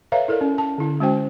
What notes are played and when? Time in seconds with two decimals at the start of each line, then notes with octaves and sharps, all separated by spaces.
0.12 A4 B4 C#5 E5 F5 A#5
0.28 E4 A4 A#4 D5
0.41 C#4
0.58 A5
0.78 D3 E4
1.00 G#3 C#4 F#4 C5 G5